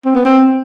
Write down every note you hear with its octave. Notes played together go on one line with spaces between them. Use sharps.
C4
B3
C4